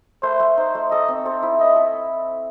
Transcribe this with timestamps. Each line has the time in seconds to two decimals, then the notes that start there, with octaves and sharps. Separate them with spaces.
0.23 A3 C5
0.40 A3
0.57 D#4 C5
0.75 A3
0.91 A4 D#5
1.08 C4
1.25 A4 C5
1.43 E4
1.59 D#5 E5
1.76 A4